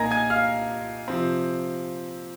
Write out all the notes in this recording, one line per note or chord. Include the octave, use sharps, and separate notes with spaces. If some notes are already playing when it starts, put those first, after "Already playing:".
Already playing: A#2 A#3 D#4 G#5 A#5 G#6 A#6
G#5 G#6
F5 F6
C3 F3 C4